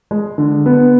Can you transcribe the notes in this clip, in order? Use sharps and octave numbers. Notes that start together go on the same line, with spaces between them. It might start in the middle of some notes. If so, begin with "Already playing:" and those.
G#3
D3
B3